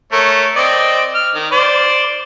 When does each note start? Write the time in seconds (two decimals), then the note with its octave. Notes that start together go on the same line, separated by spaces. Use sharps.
0.12 A3 A#4 C#5
0.56 C4 D5 D#5
1.14 F6
1.35 D#3
1.52 C5 D5